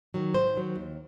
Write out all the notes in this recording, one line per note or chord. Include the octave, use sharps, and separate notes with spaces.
D#3 F#3
G#2 C5
D#3 F#3
D#2